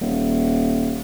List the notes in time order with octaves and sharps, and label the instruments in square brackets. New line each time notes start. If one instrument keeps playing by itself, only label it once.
[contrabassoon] D#1